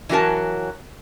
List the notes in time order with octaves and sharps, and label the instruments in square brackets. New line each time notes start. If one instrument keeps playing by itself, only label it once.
[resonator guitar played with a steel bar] E3 F#3 C#4 F#4 A#4 A5